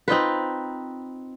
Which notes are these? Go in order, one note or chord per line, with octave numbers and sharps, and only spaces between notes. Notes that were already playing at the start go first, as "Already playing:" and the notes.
C4 D#4 F4 B4